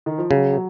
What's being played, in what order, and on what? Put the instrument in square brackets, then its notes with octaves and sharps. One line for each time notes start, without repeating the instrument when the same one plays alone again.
[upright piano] D#3
F3
[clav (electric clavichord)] C#3 [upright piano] F#3
[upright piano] F#3